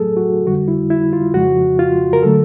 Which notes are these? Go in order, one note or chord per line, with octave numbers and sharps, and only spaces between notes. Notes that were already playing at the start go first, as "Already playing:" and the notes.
Already playing: A2 F#3 A3 G#4 A4
F#4
F2 D3 G3 F#4
E4
E4
F4
F2 C#3 F3 G#3 F#4
F4
A#4
D3 F#3 A3 A4